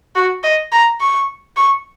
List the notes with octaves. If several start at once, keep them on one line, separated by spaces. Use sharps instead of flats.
F#4
D#5
A#5
C#6
C#6